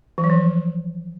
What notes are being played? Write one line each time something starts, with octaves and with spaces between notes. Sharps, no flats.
E3
F#3
F3